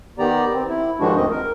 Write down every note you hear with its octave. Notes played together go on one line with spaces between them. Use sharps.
D#3 B3 G4 D5 A#5
C4
E4
G2 D#3 F3 G#3 D4 F#4
D2 D#3 C4 D#5
A#4